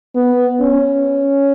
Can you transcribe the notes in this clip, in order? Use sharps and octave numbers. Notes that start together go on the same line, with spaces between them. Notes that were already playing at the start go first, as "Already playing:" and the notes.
B3
C#4